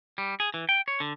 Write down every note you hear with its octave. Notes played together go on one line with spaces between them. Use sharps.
G3
G#4
E3
G5
C#5
D3